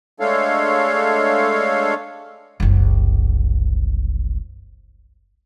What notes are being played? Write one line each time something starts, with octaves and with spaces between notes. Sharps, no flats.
G#3 A3 D4 A4 C#5 F5
F#1 C2